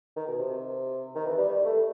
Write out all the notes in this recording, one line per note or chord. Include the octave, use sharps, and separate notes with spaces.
D#3
B2
C3
D#3
E3
G3
G3
A3